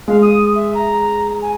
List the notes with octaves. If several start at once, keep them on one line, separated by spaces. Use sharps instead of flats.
G#3 F5
D#6
E5
A#5
G#5